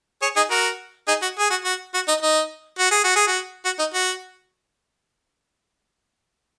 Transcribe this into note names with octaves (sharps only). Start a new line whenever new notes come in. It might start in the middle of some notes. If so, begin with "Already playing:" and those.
G#4 C#5
D#4 G#4
F#4 A#4
D#4 G#4
F#4
G#4
F#4
F#4
F#4
D#4
D#4
F#4
G#4
F#4
G#4
F#4
F#4
D#4
F#4